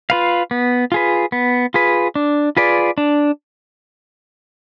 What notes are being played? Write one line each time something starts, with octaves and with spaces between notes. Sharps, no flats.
F4 B4 F5
B3
F4 G#4 B4
B3
F4 G#4 B4
D4
F4 G#4 B4 D5
D4